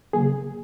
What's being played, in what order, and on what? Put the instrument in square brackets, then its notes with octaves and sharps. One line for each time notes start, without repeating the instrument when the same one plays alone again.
[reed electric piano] C#3 F#3 A#3 G#4